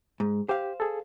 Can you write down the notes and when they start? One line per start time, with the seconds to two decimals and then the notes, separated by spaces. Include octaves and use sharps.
0.20 G#2
0.49 G4 C5 F5
0.80 G#4 A4